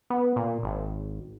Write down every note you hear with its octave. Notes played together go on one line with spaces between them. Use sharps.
B3
A#2
G#1